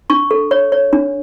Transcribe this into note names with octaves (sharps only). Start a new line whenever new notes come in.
D4 C#6
A4
C#5
C#5
D4